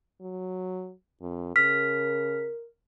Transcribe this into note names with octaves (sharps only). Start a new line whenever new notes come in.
F#3
F2
C#3 A#4 F6 B6